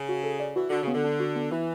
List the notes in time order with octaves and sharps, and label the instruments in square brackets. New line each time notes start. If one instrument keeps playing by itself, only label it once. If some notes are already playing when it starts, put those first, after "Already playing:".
Already playing: [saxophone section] C#3
[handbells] F#4
A4
D5
[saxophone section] E3 [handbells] F#4
[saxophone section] D3 [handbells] F#4
[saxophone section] C#3
[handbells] B3
[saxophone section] D3
[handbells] D4
F#4
B3
[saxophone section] E3 [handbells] E4